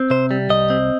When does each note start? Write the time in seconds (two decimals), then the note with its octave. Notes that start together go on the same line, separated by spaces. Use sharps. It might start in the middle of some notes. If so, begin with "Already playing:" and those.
Already playing: C4
0.10 C3 C5
0.31 G3
0.50 C2 D#5
0.70 C4